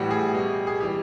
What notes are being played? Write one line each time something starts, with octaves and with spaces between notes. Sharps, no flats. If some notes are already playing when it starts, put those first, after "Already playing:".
Already playing: A2 E3 G3 F#4
G#4
B2 G3
G#4
E3 G3 G4